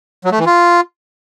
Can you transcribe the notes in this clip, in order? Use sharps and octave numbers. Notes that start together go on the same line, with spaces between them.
F#3
A3
E3
F4